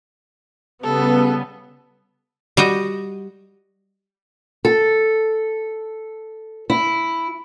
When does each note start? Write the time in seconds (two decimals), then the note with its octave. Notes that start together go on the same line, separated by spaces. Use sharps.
0.83 C#3 G3 B3 A4
2.57 G3 F#4 D#5 G5
4.65 A4
6.70 E4